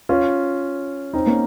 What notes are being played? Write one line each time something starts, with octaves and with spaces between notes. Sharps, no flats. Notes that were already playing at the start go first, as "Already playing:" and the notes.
C#4 F4
C4 D#4
A#3 C#4